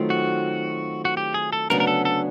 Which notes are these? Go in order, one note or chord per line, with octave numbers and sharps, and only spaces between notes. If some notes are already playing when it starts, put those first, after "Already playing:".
Already playing: D#3 F#3 A3 C4 F4
F#4
F#4
G4
G#4
A4
D2 C#3 F#3 B3 D4 A#4
A#4
A4
A4